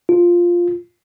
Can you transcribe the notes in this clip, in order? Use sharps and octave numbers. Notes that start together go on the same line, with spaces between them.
F4